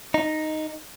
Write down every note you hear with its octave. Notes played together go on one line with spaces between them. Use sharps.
D#4